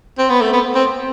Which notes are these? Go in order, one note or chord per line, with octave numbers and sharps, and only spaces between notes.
C4
B3
A3
B3
C4